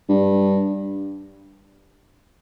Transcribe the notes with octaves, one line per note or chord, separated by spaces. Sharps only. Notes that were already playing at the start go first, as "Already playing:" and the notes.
G2